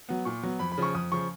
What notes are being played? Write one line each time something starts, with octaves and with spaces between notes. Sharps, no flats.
F#3 B3
A#2 C#6
F#3 B3
F2 B5
B5
C#3 F3 C#6
F2 D#6
C#3 F3 C#6